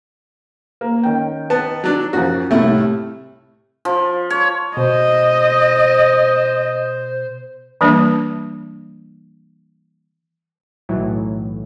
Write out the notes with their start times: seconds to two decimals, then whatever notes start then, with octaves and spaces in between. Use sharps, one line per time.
0.81 A#3
1.03 D#3 C#4 G5
1.50 B3 A5
1.84 F#3 D4
2.13 F#2 F3 F#4
2.51 C2 A2 C3 A3 E4
3.85 F3
4.30 C#5
4.77 B2 C5 D#5
7.81 E3 G3 A#3 D4
10.89 B1 A2 E3 F#3